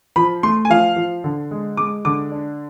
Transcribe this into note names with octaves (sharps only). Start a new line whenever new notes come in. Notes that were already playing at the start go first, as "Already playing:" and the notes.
F3 B5
A3 C6
G#5
F3 F5
F3
D3
G#3
G#3 D6
D3 D6
D4